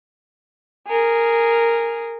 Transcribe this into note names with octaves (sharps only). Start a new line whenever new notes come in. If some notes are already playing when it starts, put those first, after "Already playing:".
G#4 A#4